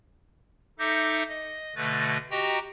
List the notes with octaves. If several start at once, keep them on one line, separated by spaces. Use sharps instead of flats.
D#4 A4 E5 D6 G6 A#6
D#5
B2 D3 A3 B4 A6 A#6
F#4 G4 D#5 G5 A#5